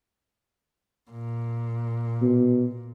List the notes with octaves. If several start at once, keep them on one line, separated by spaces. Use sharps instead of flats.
A#2
B2